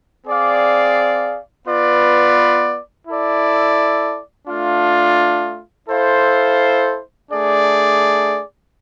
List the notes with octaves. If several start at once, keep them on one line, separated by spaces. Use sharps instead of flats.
C4 G#4 D5 F5
B3 F4 B4 D5
E4 A4 D5
A3 D4 F4
E4 A4 C5 F5
A3 D4 G#4 D5